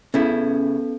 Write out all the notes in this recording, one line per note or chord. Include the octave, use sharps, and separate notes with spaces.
C#3 B3 C#4 E4 A4